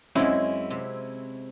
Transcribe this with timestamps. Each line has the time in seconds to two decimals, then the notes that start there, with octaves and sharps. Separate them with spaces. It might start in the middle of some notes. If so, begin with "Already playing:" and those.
0.15 F#2 G#3 C4 C#4 E4
0.70 C3